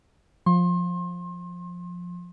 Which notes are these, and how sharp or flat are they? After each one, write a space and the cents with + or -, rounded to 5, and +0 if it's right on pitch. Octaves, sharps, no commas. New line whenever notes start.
F3 +15 C6 +35